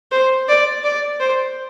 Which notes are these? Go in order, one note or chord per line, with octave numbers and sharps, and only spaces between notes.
C5
D5
D5
C5